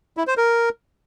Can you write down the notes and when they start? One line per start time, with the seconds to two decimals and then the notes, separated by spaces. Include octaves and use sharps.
0.17 E4
0.27 C5
0.37 A#4